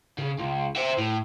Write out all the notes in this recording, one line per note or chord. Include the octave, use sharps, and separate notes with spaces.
C#3
C#2
C5 E5
A2